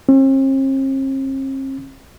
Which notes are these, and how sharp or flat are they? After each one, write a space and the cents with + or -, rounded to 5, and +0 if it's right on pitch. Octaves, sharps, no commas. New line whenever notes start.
C4 +45